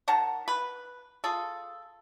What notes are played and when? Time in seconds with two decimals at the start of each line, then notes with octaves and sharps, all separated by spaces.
0.08 D#3 F#5 A5 A#5
0.48 B4
1.24 F4 G#4 A4